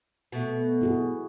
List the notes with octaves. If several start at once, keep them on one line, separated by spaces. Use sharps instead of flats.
B2 A3
E4 F#4 G#4